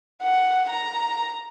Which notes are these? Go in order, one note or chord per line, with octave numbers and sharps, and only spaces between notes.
F#5
A#5